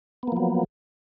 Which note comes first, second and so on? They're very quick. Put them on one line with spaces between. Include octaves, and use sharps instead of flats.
B3 A#3 F3 F#3